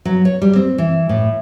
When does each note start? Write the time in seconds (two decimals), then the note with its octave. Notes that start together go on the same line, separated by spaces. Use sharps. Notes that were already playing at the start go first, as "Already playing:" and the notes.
0.05 F#3
0.25 C#5
0.42 G3
0.56 C4
0.78 E3
1.09 A2